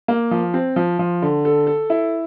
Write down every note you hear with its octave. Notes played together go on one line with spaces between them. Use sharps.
A#3
F3
C4
F3
F3
D3
A4
A4
E4